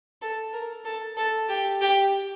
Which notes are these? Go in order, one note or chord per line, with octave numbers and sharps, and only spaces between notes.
A4
A#4
A4
A4
G4
G4